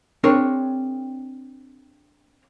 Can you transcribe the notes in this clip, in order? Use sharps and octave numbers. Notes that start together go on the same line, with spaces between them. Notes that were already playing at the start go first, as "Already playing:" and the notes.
C4 D4 G#4 A#4 C#5